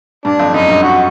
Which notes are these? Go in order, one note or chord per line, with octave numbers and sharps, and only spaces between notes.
G2 D4
F2
F#2 D#4
G2
F#4